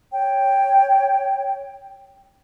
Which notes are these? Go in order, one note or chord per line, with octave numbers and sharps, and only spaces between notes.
C#5 G5